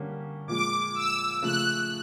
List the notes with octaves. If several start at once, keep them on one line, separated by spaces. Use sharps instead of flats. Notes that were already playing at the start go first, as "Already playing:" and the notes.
Already playing: D3 G3 A#3 C#4
A#2 F3 G#3 D6
E6
C#3 F3 A3 F#6